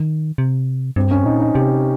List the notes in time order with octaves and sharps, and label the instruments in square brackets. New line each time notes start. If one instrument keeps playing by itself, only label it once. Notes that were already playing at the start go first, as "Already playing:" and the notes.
Already playing: [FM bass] D#3
C3
[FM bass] G2 [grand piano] C4
[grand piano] C#4
[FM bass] A#2 [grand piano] D#4
[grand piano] D#4
[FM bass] C3 [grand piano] G4